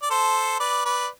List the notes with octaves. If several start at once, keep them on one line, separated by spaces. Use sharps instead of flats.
D5
A4 C5
B4 D5
B4 D5